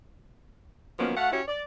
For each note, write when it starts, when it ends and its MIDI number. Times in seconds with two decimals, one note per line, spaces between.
0.99 1.15 51
0.99 1.15 53
0.99 1.15 54
0.99 1.15 58
0.99 1.15 59
0.99 1.15 61
1.17 1.30 57
1.17 1.30 66
1.17 1.30 77
1.17 1.30 78
1.32 1.42 61
1.32 1.42 64
1.32 1.42 66
1.32 1.42 67
1.32 1.42 73
1.48 1.63 74